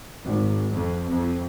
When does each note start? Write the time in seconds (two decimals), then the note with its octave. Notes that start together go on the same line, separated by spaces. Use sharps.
0.25 G#1
0.73 F2
1.10 F2